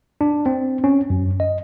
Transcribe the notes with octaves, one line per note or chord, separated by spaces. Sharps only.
D4
C4
C#4
F#2
D#5